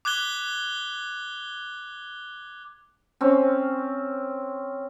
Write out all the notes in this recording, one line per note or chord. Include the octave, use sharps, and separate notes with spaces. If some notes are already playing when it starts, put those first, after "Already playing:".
D6 F#6 G#6 G7
C4 C#4